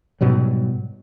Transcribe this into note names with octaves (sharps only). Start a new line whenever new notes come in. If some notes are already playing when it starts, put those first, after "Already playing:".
G#2 B2 F#3 G3